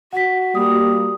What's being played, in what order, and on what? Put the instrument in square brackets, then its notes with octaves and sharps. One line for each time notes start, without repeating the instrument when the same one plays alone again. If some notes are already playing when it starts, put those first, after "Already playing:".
[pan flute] F#4 [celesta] F#5 B6
[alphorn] G3 [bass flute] A#3 [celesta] D#6